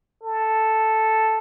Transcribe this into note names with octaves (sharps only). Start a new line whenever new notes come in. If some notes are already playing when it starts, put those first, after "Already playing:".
A4